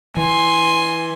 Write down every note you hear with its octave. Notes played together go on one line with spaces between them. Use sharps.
E3 G#5 C6